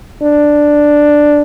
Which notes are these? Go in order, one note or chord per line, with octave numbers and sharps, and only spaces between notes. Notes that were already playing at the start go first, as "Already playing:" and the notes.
D4